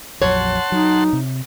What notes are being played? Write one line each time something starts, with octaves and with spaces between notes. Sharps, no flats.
A#1 F2 F#3 C#5 F#5 A5 C6
F#3 D#4
C3